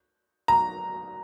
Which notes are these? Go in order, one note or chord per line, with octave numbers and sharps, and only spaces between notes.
A#5